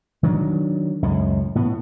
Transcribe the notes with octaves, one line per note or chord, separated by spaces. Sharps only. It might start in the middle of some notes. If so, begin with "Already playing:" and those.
D#3 F#3 G#3 D4
C#2 F#2 A2 G#3
A2 B3